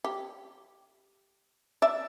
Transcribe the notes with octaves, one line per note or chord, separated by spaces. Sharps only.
G4
D5 E5